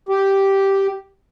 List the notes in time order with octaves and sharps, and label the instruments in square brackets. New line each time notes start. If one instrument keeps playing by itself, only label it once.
[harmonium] G4